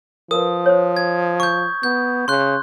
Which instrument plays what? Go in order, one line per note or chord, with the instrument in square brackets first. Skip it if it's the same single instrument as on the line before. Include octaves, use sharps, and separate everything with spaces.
[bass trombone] F3 [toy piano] A#4 B4 [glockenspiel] D#6
[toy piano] C5 C#5
[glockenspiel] G#6
C#6 G6
[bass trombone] B3 [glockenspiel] G6
[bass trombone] C#3 [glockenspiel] C6 F#6